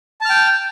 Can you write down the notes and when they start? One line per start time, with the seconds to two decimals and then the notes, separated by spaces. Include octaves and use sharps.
0.21 A5
0.25 F6
0.30 G5